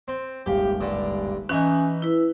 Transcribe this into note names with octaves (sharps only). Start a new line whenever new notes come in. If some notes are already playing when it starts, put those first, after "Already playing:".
C4
D#1 G#1 G4 F5
G2 D3
E3 C#4 D#4 E5 G#5 F#6
E4 B4